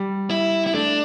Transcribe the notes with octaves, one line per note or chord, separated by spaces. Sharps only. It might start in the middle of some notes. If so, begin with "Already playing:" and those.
Already playing: G3
E4
E4
A3 D4